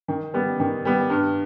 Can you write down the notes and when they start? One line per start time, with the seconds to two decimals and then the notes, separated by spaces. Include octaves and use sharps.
0.08 D#3
0.34 G3 B3
0.60 D#3
0.85 G3 B3
1.10 G2